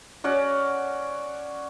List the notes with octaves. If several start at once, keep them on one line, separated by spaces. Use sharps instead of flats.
C#4 F#4 D5 F#5